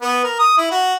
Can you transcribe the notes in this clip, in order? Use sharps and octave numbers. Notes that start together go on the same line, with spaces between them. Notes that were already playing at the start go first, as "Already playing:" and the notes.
B3
A#4
D#6
E4
F#4